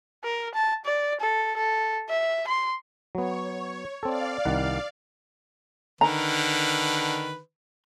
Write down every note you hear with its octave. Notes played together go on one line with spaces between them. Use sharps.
A#4
A5
D5
A4
A4
E5
C6
F#3 B3 C#5
C4 A4 D5 F5
C2 D#3 F#5
D3 D#3 B4 A#5